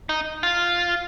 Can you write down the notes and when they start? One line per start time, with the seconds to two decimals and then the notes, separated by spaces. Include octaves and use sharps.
0.09 D#4
0.43 F4